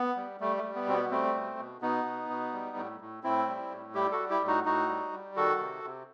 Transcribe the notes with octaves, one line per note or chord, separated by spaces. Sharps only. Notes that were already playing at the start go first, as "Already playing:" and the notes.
Already playing: B3
G3
G3 A3
A3
G3
B3
B2 C4
B3
G3 A3 C4
B2
B2
B2 B3 D#4
B2
B2
G3
A2
A2
A2 C4 E4
G3
A2
G3 E4 G4
F#4 A4
G3
E4 G4
A2
D#4 F#4
A2 D#4 F#4
G3
G3
D#3 F#4 A4
C3
C3